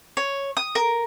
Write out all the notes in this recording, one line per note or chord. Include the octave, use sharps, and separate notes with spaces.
C#5
D#6
A#4